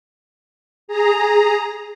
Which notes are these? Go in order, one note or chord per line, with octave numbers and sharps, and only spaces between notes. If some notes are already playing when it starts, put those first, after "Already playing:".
G#4 A#5